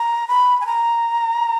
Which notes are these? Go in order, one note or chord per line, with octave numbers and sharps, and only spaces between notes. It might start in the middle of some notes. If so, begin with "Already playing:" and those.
Already playing: A#5
B5
G#5
A#5